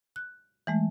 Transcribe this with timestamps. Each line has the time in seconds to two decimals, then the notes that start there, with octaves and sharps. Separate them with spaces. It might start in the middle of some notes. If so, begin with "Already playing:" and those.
0.16 F#6
0.67 E3 G#3 A3